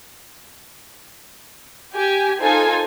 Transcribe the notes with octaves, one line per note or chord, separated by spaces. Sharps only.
G4 G#5
D#4 F4 A4 A#4 C5 G#5